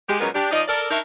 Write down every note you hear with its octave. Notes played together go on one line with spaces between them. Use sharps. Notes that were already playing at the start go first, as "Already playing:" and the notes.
G#3 G4
A#2 F#3 G#3 B3 C#4 A#4
D4 G4
F3 D#4 D5 D#5
A4 A#4 D5
D4 D#4 A#4 C#5 E5